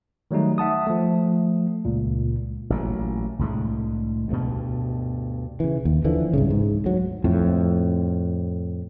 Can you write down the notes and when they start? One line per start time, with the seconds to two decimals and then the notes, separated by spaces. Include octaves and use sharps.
0.31 D#3 F#3 G3 A3 D#4
0.58 E5 F#5 A5 D#6
0.87 F3 A3
1.85 C#2 A#2
2.70 A1 A#2 F#3
3.39 C2 A2 D3 G#3
4.28 D2 G2 B2
5.60 C#3 E3
5.85 D#2
6.05 D3 E3 F3
6.34 C2 G#2 C#3
6.50 G#2
6.84 D2 F#3
7.24 F2 A2